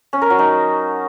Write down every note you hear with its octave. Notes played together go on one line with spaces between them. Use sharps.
C#4
A#4
F#3
D#4